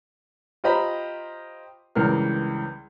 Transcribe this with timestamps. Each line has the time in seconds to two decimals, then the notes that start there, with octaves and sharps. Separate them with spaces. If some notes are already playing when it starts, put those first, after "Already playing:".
0.64 F4 G4 C5 D#5 A#5 B5
1.95 C#2 G2 E3 A#4 F6